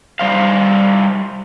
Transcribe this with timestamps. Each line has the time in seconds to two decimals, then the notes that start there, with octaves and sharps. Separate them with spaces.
0.19 G3 C5 F5